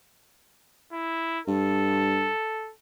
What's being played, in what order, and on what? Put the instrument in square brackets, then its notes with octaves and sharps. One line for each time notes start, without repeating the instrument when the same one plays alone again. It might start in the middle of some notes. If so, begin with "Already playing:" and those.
[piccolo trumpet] E4
[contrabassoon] G2 [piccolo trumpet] A4